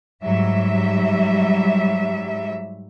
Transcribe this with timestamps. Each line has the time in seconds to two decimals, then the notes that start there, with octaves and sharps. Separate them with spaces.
0.23 G#2 F#3 G3 E5